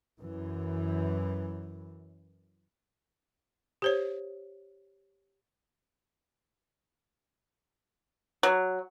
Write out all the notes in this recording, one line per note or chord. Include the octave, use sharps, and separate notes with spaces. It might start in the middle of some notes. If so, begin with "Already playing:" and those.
F#2 E3
G4 C5 C#5
F#3